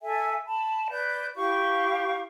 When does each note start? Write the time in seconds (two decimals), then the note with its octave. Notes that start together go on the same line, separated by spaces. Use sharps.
0.02 A4 E5 G#5
0.46 A5 B5
0.89 B4 D5 G6
1.35 E4 G4 F5 C#6